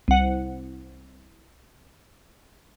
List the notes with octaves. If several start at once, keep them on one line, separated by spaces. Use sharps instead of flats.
C2 F#5